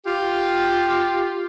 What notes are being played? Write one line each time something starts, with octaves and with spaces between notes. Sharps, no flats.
F4 G4